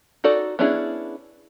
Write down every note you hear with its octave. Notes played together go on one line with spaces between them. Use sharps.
D#4 F#4 A4 D5
B3 C#4 D4 E4 G#4